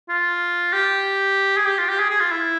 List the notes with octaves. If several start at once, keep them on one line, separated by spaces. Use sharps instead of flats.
F4
G4
G#4
G4
F4
G4
G#4
G#4
F4
E4